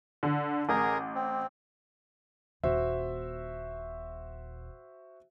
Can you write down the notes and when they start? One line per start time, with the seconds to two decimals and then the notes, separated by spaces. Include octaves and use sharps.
0.23 D3
0.69 A1 G#4 A#4
1.15 C4
2.64 D#1 A#2 F#4 C5 E5